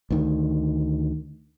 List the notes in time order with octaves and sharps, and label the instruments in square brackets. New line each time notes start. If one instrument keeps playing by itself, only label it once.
[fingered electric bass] D2 D#3